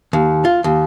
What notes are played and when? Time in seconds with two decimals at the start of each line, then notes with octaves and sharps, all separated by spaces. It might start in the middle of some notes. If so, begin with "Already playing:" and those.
0.13 D#2
0.45 F4
0.64 D#2